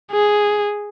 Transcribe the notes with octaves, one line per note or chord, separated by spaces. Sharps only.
G#4